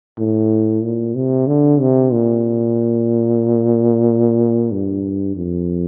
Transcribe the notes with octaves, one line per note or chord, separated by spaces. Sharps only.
A2
A#2
C3
D3
C3
A#2
G2
F2